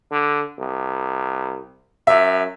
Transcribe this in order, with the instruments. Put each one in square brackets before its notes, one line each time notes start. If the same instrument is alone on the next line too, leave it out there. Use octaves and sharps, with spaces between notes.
[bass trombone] D3
C2
[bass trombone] F#2 [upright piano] E5